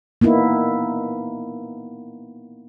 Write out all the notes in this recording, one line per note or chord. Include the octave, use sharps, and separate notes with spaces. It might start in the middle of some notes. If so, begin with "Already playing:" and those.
A#3 B3 D#4 E4